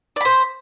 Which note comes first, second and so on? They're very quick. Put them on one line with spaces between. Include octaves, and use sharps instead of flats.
D5 B5 C5